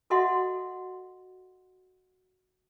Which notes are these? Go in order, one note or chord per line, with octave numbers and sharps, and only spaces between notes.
F#4 A4 D#5 E5 F#5 C6